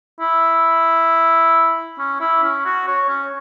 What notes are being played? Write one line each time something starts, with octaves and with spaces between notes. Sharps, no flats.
E4
C#4
E4
C#4
F#4
C#5
C#4